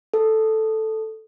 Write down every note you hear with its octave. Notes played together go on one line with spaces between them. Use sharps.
A4